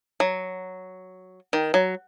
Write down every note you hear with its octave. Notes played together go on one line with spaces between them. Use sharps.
F#3
D#3
F#3